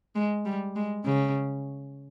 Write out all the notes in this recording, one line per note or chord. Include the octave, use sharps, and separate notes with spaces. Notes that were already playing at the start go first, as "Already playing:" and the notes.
G#3
G3
G#3
C#3